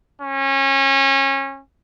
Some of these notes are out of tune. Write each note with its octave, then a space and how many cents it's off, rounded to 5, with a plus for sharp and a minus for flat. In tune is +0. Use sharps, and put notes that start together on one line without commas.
C#4 -25